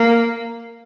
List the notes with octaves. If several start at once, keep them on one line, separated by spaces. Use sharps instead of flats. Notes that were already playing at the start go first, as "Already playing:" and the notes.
Already playing: A#3